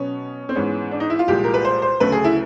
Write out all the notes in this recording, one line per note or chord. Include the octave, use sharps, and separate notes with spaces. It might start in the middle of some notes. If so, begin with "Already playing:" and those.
Already playing: B2 F#3 B3 C#4
C4
G#2 E3 G#3 B3 C#4
D4
D#4
E4
F4
C2 A#2 F3 G#3 G4
A#4
B4
C5
C5
D2 C#3 F#3 A3 B4
G#4
E4